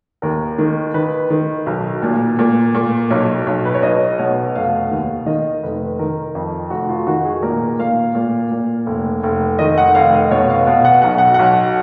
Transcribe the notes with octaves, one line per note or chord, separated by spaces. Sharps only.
D#2 A#4
D#3
D#3 B4
D#3
B1
A#2
A#2
A#2
B1 C#5
B1
B4
C#5
B1 D#5
B2 C#5
F1 F5
D#2
D#3 D#5
F1 B4
D#3 A#4
F2
F1 F#4
F4
D#3 F#4
G#4
A#2 A#4
A#2 F5
A#2
A#2
F1
F1
D#3 D#5
F#5
F1 F5
D#5
B2 C#5
F5
B2 F5
F#5
B1 F#5
F#5
B1 F#5